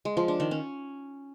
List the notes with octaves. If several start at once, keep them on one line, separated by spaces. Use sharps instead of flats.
G#3
F3
D4
D#3
C#4